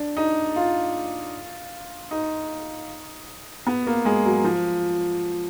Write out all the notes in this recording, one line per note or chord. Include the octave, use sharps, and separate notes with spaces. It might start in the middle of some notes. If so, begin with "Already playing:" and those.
Already playing: D4
D#4
F4
D#4
B3
A#3
G#3
F#3
F3